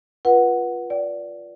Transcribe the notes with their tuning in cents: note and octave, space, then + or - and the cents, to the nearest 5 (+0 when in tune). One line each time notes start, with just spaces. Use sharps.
F4 +0 B4 -25 F#5 +0
D5 -15 G5 -35